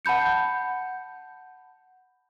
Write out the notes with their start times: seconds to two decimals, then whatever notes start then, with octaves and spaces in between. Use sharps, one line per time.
0.05 F#5 A5 B5 G6 C#7